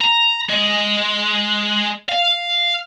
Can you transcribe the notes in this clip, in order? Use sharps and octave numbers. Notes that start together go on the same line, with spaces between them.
A#5
G#3
F5